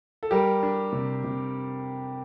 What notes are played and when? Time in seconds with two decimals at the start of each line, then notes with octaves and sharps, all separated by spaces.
0.23 A4
0.31 G3 G4 A#4
0.63 D4
0.93 C3
1.24 C3